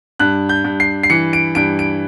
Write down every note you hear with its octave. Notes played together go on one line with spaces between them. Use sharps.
G2 F#6
G6
G2
C7
C7
E3 C#7
D7
G2 D7
D7